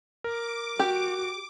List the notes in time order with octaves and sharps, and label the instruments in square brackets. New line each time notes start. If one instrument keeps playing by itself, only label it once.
[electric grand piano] A#4 [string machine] D6
[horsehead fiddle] F#4 [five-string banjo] G4